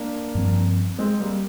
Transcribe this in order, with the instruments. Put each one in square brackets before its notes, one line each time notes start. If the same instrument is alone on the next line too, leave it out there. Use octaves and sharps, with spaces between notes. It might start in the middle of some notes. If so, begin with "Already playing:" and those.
Already playing: [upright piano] A#3 D4
[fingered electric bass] G2 F3 C4
[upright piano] G#3 C4
G3 A#3